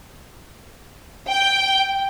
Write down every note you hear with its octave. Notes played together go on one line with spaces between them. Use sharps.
G5